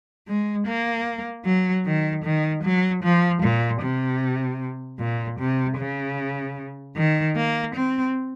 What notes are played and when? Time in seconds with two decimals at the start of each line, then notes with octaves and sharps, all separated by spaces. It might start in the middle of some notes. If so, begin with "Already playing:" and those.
0.28 G#3
0.67 A#3
1.45 F#3
1.85 D#3
2.24 D#3
2.64 F#3
3.03 F3
3.43 A#2
3.82 C3
5.00 A#2
5.39 C3
5.78 C#3
6.96 D#3
7.36 A#3
7.75 C4